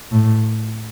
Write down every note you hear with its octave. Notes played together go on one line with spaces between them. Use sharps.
A2